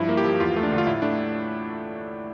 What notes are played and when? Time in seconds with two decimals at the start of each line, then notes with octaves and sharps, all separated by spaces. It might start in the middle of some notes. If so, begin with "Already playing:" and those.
Already playing: G2 F3 E4
0.09 A#3
0.17 G4
0.24 F3
0.40 E2 F4
0.56 A3
0.63 D4
0.72 D3
0.78 F4
0.87 A2 E4
1.02 A3 D4